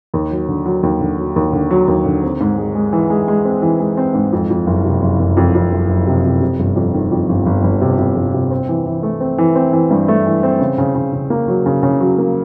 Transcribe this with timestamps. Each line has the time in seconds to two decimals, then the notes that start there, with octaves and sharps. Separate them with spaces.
0.14 D#2
0.31 F#3
0.49 D3
0.66 F#3
0.83 D#2
1.01 D3
1.18 F#3
1.36 D#2
1.53 D3
1.71 F#3
1.88 D#2
2.05 D3
2.23 C4
2.41 G#2
2.58 G#3
2.75 G#3
2.93 E3
3.10 G#3
3.28 G#3
3.45 C4
3.62 E3
3.80 G#3
3.97 C4
4.14 G#2
4.32 F2
4.50 F2
4.67 F#1
4.85 C3
5.02 F#1
5.19 F#1
5.37 F2
5.55 F2
5.72 F#1
5.89 F#1
6.07 C3
6.25 C3
6.42 C3
6.59 G1
6.76 F2
6.95 D#3
7.12 F2
7.29 G1
7.46 G1
7.64 G1
7.81 C3
7.99 C3
8.16 G1
8.34 C3
8.51 C4
8.68 E3
8.86 E3
9.03 A3
9.21 C4
9.38 E3
9.56 C4
9.73 E3
9.91 G2
10.08 A3
10.26 E3
10.43 C4
10.60 C#3
10.78 C#3
10.95 C#3
11.13 C#3
11.30 A#3
11.48 F#3
11.66 C#3
11.83 C#3
12.00 F#3
12.18 A#3